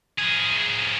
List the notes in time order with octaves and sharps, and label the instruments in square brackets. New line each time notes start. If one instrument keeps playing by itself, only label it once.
[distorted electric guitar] F3 G#4